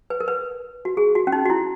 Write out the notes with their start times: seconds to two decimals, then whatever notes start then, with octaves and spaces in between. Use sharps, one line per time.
0.10 B4
0.20 A#4
0.28 B4
0.85 F#4
0.97 G#4
1.15 F#4
1.27 C#4
1.32 D#4
1.46 F#4
1.50 E4